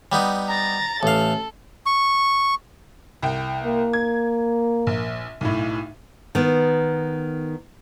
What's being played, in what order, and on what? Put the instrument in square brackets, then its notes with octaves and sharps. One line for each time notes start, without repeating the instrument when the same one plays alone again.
[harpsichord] G3 B3 D#4
[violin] A#5 A6
[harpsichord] A1 F5 [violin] A4
[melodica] C#6
[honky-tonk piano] C2 G5
[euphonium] A#3
[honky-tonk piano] G#6
A#1
B1 A2
[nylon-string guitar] D#3 B3